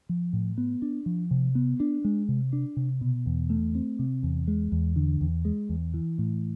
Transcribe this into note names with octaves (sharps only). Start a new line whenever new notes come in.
F3
A2
B3
D4
F3
C3
B3
D4
G#3
C3
D4
C3
B2
E2
A3
C4
C3
E2
G#3
E2
D3
E2
G#3
E2
E3
A2